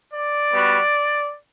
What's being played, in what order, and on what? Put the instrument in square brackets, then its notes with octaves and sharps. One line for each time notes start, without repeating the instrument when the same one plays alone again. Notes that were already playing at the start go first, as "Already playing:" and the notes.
[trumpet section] D5
G3 B3 F#4